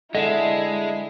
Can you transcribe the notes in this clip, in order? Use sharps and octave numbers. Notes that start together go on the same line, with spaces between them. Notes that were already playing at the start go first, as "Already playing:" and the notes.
D3 G#3 E4 D#5 E5 A5